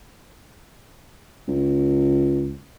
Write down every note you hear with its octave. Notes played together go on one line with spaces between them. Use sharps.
C#2